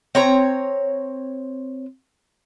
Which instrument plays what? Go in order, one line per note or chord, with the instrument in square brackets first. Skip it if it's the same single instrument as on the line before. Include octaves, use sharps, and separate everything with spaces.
[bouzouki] C4 C#5 A#5